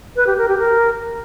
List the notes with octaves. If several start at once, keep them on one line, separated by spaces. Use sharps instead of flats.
B4
G4
A#4
G4
A#4